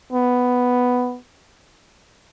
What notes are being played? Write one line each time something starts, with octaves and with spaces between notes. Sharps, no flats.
B3